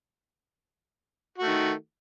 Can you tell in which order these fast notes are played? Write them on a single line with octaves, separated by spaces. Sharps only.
F#4 A3 D#3